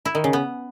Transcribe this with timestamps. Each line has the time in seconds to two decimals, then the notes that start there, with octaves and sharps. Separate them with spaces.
0.05 E4
0.15 D#3
0.24 C#3
0.33 B3